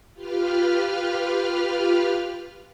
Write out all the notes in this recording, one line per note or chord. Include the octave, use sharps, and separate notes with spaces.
F4 G4 B4 F6